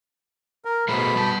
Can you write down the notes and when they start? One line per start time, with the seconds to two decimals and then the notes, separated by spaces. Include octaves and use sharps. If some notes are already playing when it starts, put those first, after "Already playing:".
0.65 A#4
0.89 B2 A3 G#4 C5 B5
1.16 G3 A5